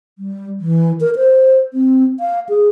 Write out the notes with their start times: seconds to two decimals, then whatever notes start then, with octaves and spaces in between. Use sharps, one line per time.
0.19 G3
0.60 E3
1.00 A#4
1.16 C5
1.74 C4
2.20 F5
2.49 G#4